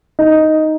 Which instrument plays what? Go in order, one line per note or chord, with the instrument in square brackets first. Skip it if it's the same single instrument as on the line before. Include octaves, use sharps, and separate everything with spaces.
[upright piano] D#4